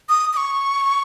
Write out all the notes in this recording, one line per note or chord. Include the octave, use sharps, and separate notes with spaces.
D#6
D#6
C#6